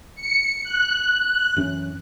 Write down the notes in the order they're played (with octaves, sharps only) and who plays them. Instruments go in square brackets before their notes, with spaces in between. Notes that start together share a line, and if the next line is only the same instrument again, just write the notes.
[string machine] C#7
F#6
[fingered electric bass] F#2 E3 C#4